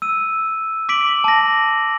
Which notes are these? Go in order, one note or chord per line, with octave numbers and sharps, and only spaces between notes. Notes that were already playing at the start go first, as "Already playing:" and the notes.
E6 D#7
D6 B6 D7 F#7
A5 A#6